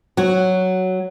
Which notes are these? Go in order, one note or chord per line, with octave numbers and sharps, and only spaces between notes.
F#3 F#4